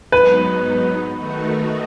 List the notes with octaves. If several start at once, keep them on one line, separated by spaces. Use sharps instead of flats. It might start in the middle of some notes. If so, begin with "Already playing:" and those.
G#2 F#3 B3 D#4 B4
D#3 A3 D#4 F#4